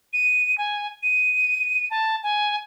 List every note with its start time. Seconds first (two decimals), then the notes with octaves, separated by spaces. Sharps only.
0.13 D#7
0.58 G#5
1.03 D#7
1.90 A5
2.23 G#5